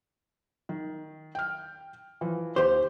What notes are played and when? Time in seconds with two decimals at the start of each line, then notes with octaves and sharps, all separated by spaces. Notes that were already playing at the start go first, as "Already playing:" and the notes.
0.69 D#3
1.35 G5 F6
2.21 E3 F3
2.56 D#2 G4 C5